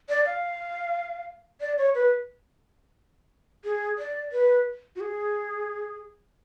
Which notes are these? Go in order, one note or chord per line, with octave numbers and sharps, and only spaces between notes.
D5
F5
D5
C#5
B4
G#4
D5
B4
F#4
G#4